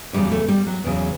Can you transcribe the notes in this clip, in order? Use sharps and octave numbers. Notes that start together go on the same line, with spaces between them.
E2 C#3 F#3 G3
A3
G3
F#3
E2 C#3 F#3